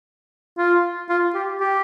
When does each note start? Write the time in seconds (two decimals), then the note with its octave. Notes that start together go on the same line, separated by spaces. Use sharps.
0.58 F4
1.09 F4
1.35 G4
1.60 G4